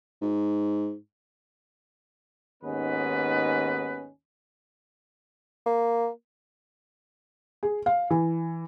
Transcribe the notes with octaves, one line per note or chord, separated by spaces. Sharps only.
G#2
D#2 G#2 B3 C#4 B4 D#5
A#3
G#4
F5
E3